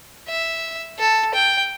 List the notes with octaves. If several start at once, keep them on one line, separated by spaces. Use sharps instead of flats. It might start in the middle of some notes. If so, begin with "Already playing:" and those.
E5
A4
G5